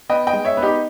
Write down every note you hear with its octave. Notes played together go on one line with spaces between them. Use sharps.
B3 D#5 G5
D#5 G5
G#3
C#5 E5
B3
D#4 G4